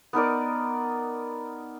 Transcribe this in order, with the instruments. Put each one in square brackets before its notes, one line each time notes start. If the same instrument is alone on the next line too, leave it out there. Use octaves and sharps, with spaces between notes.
[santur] B3 D#4 A#4 D5